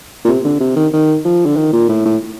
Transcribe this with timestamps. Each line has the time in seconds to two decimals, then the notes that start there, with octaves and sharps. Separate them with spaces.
0.25 A#2
0.28 C3
0.45 D3
0.60 C3
0.76 D#3
0.93 D#3
1.24 F3
1.45 D3
1.57 D#3
1.73 A#2
1.89 A2
2.05 A2